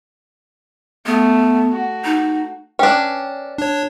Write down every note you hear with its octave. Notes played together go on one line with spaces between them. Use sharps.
A3 B3
F#4
D#4
C#4 D4 B4 G5
D4 C#5